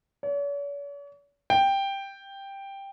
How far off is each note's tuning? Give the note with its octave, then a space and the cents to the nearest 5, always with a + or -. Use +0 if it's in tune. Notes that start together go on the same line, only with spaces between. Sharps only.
C#5 +45
G5 +5